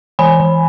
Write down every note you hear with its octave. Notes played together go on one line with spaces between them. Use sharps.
E3 G#5 B5
E3